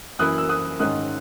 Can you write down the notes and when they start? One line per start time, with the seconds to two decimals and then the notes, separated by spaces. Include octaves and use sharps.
0.19 F#2 E3 A#3 E4 D#6 F#6
0.38 E6
0.49 D#6 F#6
0.80 G#2 D#3 G#3 C#4 D#6 F#6